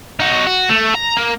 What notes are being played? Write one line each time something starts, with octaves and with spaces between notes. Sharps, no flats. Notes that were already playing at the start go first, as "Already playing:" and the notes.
D#4 F#4
F#4
A3
A#5
A#3